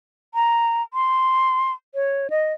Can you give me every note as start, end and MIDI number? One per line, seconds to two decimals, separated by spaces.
0.35 0.83 82
0.94 1.72 84
1.95 2.28 73
2.30 2.53 75